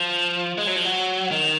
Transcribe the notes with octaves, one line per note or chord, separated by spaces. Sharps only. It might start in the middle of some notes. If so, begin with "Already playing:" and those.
Already playing: F3
G#3
F#3
F3
F#3
D#3